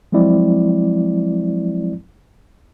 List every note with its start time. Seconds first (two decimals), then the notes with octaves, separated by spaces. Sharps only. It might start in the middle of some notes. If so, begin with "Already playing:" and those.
0.12 F3 F#3 G#3 C4 E4 D5